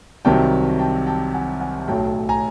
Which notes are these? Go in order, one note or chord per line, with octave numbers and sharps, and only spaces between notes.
C2 C3 D#3 F#3 G5 A5
G5 A5
G5 A5
F#5 G#5
F#5 G#5
B1 A2 F#3 A3 G5 A5
G#5 A#5